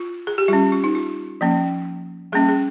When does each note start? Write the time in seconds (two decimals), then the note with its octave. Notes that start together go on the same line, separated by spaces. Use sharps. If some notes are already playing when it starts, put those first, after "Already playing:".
Already playing: F4
0.27 G#4
0.38 G4
0.48 G3 C#4 F4
0.72 F4
0.84 D#4
0.95 F4
1.41 F3 A#3 C#4
2.32 G3 A#3 C#4 G#4
2.49 G#4